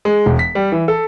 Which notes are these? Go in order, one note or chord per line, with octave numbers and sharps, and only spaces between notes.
G#3
E1
B6
G3
E3
A4